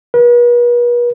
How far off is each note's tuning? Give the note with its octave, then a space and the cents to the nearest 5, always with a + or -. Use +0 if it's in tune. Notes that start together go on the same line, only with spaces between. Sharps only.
B4 -40